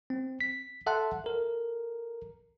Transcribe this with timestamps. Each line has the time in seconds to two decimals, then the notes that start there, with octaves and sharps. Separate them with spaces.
0.10 C4
0.41 B6
0.86 A4 E5 F#5 A5 C6 F#6
1.24 A4 A#4